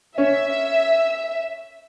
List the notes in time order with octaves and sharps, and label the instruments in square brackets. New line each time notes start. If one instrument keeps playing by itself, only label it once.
[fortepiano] C#4 [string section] E5